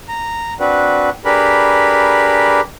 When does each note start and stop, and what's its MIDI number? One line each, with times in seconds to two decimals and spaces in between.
0.08 0.54 82
0.60 1.09 60
0.60 1.09 62
0.60 1.09 66
0.60 1.09 71
1.25 2.60 62
1.25 2.60 67
1.25 2.60 68
1.25 2.60 70
1.25 2.60 71
1.25 2.60 83